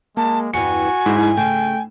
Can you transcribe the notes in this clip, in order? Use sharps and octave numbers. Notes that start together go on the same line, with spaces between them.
G#3 A#3 A5
E2 G2 E3 F#4 G#5 C#7
G#2 E4
C#3 A3 G5